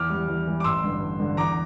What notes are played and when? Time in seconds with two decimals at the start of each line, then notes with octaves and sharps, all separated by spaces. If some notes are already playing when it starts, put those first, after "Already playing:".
Already playing: E2 D6 F6
0.10 E3 G3
0.28 E2
0.47 E3 G3
0.60 D6
0.64 A1 C6 E6
0.83 G2 D3
1.01 A1
1.19 G2 D3
1.37 E2 A#5 D6